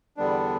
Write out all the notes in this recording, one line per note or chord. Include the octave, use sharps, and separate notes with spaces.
E2 D3 G3 B3 D4